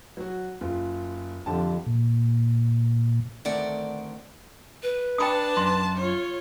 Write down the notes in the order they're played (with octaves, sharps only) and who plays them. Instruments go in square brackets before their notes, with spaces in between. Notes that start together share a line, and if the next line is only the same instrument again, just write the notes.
[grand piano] F#3 F#4
F#1 F4
[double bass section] F2 [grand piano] D3 G4 A5
[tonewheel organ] A#2
[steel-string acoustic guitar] D2 D#3 A3 C4 D5 F#5
[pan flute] B4
[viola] D4 A5 [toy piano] G5 B5 D#6
[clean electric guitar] F#2 [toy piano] C6
[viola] F4 C#5